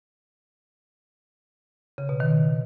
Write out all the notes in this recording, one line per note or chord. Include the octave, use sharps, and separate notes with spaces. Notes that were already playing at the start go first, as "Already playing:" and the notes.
C#3
B2
D#3